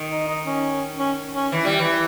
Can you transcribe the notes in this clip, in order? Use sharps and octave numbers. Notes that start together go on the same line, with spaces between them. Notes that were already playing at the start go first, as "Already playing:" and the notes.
Already playing: D#3
D#4
D#4
C#4
C#4
C#4
E3
G3
E3